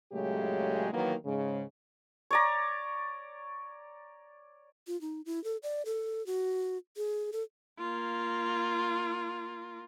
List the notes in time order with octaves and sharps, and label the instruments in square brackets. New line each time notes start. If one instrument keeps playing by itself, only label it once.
[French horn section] A#2 C#3 F#3 G#3 A3 G4
D#3 E3 F#3 A#3 B3
G#2 C#3 G#3
[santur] C#5 D5 A#5
[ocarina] F4
D#4
E4
A4
D5
A4
F#4
G#4
A4
[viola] A#3 F4